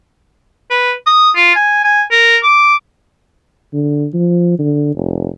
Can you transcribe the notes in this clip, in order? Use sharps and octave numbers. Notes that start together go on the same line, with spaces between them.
B4
D#6
F4
G#5
G#5
A#4
D6
D3
F3
D3
F1